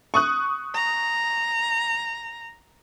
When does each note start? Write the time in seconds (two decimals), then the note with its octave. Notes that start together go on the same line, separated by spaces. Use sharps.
0.14 C#6 D#6 F#6
0.74 A#5